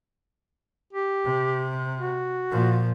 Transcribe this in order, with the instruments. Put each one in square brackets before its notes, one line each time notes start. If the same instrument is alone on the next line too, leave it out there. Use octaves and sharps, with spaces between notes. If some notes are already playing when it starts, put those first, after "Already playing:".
[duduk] G4
[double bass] C3
[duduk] F#4
[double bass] A#2 F3